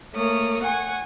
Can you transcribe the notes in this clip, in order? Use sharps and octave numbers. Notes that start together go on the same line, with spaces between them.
A3 A#3 C#5 D#6
F#5 G#5 C#6